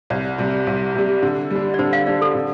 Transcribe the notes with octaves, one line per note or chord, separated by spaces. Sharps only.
C2 D5
C3 G3
C2
C3 G3
D3
G3 D4
D5
D3 C5
F5
G3 D4 D5
A4
D3